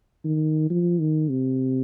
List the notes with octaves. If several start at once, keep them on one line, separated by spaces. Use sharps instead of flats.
D#3
F3
D#3
C3